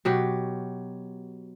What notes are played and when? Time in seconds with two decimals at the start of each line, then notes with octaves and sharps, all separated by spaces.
0.05 B2 F#3 G4